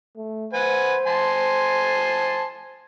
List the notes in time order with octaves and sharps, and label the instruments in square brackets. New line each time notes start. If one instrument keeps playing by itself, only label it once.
[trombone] A3
[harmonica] B4 F#5 G#5 [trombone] C5
[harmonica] G#5 A5 C6